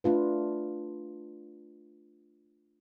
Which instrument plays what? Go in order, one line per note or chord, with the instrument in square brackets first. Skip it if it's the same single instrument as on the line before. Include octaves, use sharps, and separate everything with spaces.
[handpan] A3 D4 F4 B4